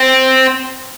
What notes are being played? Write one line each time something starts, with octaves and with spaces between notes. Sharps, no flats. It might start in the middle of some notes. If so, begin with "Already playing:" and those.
Already playing: C4